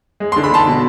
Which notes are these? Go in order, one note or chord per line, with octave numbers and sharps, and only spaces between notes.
G#3
D3 C6
B5
D3 A5 C6
B2